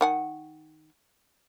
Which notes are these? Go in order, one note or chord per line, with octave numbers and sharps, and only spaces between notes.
D#3 F#5 G#5